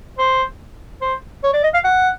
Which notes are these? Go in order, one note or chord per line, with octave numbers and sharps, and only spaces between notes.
C5
C5
C#5
D5
D#5
F5
F#5